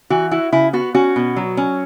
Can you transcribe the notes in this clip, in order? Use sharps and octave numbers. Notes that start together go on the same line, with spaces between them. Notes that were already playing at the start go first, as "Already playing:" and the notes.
E3 F#4
E4 F#4
C#3 E4
B3 F#4
C#4 F#4
B2
F#3
C#4